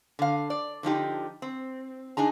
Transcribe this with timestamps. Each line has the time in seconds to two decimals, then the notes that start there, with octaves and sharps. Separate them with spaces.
0.19 D3 F5
0.50 D5
0.83 D3 F3 D#4 G4
1.42 C4
2.17 D4 D#4 G#4 A#5